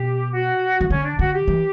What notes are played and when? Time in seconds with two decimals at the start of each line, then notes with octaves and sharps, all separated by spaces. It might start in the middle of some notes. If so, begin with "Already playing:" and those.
Already playing: B2 G4
0.33 F#4
0.81 E3
0.90 D3 C#4
1.05 D4
1.19 D3 F#4
1.33 G4
1.48 E3